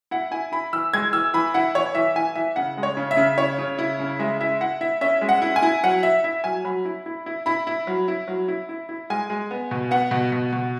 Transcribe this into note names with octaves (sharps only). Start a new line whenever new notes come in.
E4 F#5
E4 G#5
E4 B5
E3 E6
G#3 G#6
E3 E6
E3 B5
E4 F#5
E3 C#5
E3 E5
E3 G#5
E3 E5
C#3 F#5
G#3
C#5
C#3
E5
C#3
E4 C#5
C#3
E4
C#3
G#3 E5
E4 E5
E4 F#5
E4 E5
C#4 E5
G#3
F#5
E4
G#5
E4
F#3 F#5
E4 E5
E4 E5
F#3 G#5
F#3 B5
E4
E4
E4
E4 B5
E4
F#3
E4
F#3
E4
E4
E4
G#3 G#5
G#3
B3
B2
B3 F#5
B2
B2
B2